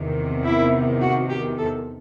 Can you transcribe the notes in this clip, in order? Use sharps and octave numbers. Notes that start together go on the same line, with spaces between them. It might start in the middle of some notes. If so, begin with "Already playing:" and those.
Already playing: E2 C3 D#3
E4
F#4
G4
A4